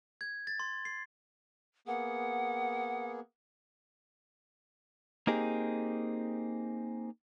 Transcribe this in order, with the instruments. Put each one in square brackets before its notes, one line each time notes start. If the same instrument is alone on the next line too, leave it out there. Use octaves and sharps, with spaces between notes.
[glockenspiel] G#6
A6
C6
C7
[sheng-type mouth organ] A#3 B3 G#4 [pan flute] F#5
[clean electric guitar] A#3 C4 D#4 G4 G#4